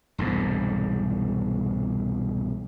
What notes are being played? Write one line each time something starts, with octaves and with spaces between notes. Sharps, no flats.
E1 C2 G#2